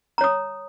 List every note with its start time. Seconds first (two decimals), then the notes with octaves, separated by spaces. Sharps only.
0.18 A#5
0.21 C#5
0.24 D#6